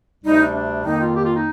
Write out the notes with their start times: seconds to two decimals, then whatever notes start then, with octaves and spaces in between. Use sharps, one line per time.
0.24 D2 C3 G3 D#4
0.39 D4
0.54 D4
0.84 F2 D#3 A#3 D#4
0.99 F4
1.14 G4
1.24 F4
1.34 D#4